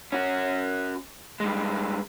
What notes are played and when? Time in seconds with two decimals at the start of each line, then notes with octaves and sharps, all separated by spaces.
0.12 C#4 F#4
1.40 G2 G#3